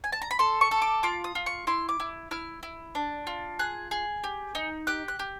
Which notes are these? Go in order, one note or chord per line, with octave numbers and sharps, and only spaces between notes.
G#5
A5
A#5
B5
A4 C6
C#6
A4
D6
F4 D6
D#6
F4
C#6
E4 C6
D6
E4
E4 F6
E4
D4
F4
G#4 F#6
G#4
G4
D#4
G4 F#6
F#6
G4